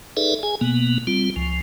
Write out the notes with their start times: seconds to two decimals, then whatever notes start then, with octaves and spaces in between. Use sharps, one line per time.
0.17 D#4 G#4 A4 B4 D5 E5
0.43 G#4 G#5
0.61 B2 A#3 B3
1.07 G3 C4 F4
1.36 C#2 F3